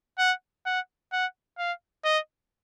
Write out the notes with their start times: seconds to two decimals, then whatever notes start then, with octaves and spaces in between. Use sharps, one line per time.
0.19 F#5
0.66 F#5
1.12 F#5
1.58 F5
2.05 D#5